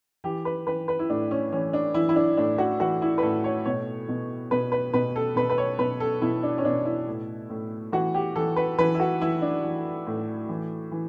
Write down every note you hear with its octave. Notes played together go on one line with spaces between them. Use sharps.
E3 G4
B4
E3 B4
B4
E4
A2 D4
C#4
E3 C#4
D4
E3 E4
E4
D4
A2 D4
F#4
E3 F#4
E4
B4
A2 A4
C#5
B2 C#5
B2
B2 B4
B4
B2 B4
A4
B2 B4
B4
C#5
B2 B4
A4
B2 E4
D4
C#4
B2 D4
E4
A2
A2
E3 F#4
G4
E3 A4
B4
E3 B4
E4
F#4
E3 E4
D4
E3
A2
E3
E3